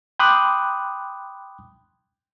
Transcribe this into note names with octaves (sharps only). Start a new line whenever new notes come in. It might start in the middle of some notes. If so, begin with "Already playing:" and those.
G5 B5 C6 D6 D#6 F#6